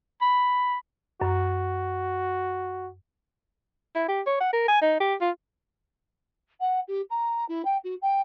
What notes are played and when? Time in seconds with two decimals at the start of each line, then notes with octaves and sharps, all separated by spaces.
0.22 B5
1.21 F#2 F#4
3.95 E4
4.08 G4
4.27 C#5
4.41 F#5
4.53 A#4
4.68 G#5
4.82 D#4
5.01 G4
5.21 F4
6.60 F#5
6.87 G4
7.10 A#5
7.48 E4
7.65 G5
7.84 F#4
8.02 G5